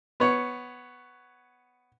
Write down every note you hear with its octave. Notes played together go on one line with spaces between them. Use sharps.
B3 C#5